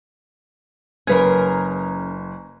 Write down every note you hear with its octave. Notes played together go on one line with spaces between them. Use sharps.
F#1 C#4 G#4 A#4 B4 G#6